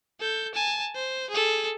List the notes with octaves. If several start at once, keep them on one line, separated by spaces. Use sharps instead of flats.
A4 G6
G#5 A5
C5
G#4 A4